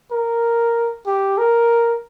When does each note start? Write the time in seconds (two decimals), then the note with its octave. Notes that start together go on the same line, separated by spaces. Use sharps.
0.11 A#4
1.07 G4
1.38 A#4